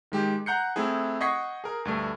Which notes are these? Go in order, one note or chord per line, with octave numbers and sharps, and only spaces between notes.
D#3 G#3 G4
F#5 A#5 F#6 G6 C7 C#7
A3 C4 E4 G#4
D#5 F#5 C#6 G#6 B6 C7
G#4 A#4
D2 G2 A3